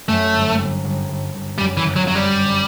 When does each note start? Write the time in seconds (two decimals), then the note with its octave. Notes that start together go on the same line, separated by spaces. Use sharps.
0.09 F#2 A3
0.33 G1
0.59 G1
0.84 G1
1.09 G1
1.34 G1
1.58 F#2 G3
1.77 E3
1.83 G1
1.96 F#3
2.08 F#2 F#3
2.15 G3
2.34 G1